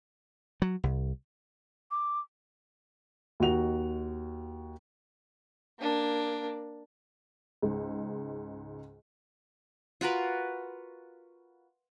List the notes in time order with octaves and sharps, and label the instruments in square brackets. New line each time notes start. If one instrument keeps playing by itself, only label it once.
[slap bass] F#3
C2
[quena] D6
[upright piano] D#2 D#4 F#4 F7
[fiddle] A#3 D4
[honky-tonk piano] C#2 G#2
[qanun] F4 F#4 A#4 B4